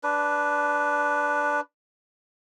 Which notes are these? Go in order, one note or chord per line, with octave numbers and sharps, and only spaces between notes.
D4 B4